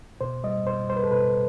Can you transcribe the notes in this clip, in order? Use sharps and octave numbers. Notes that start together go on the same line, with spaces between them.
B2 C5
G3 D#5
B2 C5
G3 C5
B4
A4
B2 B4